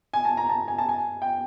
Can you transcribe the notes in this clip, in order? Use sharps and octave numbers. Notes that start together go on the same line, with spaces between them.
G#5
A5
A#5
A5
G#5
A5
G#5
G5